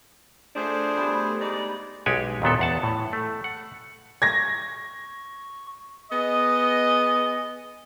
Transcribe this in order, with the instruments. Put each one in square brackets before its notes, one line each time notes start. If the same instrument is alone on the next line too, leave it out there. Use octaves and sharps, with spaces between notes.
[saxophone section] F3 D4 [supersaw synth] A3 [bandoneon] G#4 C5
[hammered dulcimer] G3 B3 G4
[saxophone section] G#2 G#3 D5
[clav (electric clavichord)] B1 G#3 G4 F#5 G#5
D#2 A#2 B3 A4
E2 F#5 A5
A2
A3
F#5
[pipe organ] C#6 [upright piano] G#6 A#6
[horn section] B3 G#4 D#5